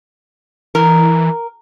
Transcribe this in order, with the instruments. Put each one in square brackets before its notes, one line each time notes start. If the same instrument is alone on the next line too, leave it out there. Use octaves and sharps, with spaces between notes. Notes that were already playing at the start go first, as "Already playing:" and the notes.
[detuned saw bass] E3 [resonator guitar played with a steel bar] A#4